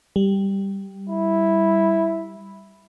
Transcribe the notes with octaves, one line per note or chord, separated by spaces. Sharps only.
G3
E4